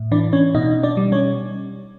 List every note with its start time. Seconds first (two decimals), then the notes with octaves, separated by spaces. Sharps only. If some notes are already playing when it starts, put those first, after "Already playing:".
Already playing: A2
0.12 E3 D4 D5
0.33 C#4 C#5
0.55 B2 D#4 D#5
0.83 D4 D5
0.97 G3
1.12 C#4 C#5